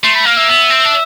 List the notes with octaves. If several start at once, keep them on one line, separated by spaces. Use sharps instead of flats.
A3 C6
B5
A#3 F5
E5
B3
C4
D4